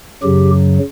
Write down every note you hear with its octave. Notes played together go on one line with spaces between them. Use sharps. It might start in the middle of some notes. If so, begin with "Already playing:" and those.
F#2 C#3 F#3 G4